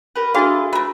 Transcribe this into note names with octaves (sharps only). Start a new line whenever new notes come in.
G4 A#4 B4
D4 E4 F#4 G#4 A4 D#5 F5
A3 A#4 B4